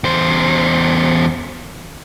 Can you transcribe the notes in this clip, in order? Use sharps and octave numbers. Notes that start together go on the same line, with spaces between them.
E2 C5